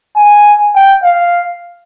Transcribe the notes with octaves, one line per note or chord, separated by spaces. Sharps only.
G#5
G5
F5